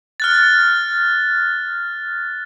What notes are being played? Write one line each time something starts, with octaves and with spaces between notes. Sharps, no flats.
F6 F#6 A6